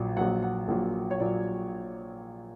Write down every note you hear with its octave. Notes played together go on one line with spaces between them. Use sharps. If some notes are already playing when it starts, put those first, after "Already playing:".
Already playing: A#1 A#2 F#3 D5
A#1 A#2 F#3 F#5
F#5
A#1 A#2 F#3
C#5
A#2 F#3 D5